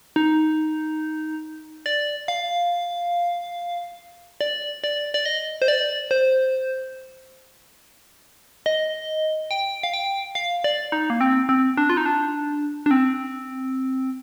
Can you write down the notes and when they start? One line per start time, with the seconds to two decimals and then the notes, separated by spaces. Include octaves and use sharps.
0.16 D#4
1.86 D5
2.28 F5
4.41 D5
4.84 D5
5.14 D5
5.26 D#5
5.62 C5
5.68 D5
6.11 C5
8.66 D#5
9.51 G5
9.83 F5
9.93 G5
10.35 F5
10.64 D5
10.92 D#4
11.10 A#3
11.21 C4
11.49 C4
11.77 D4
11.90 F4
11.97 D#4
12.06 D4
12.86 D4
12.91 C4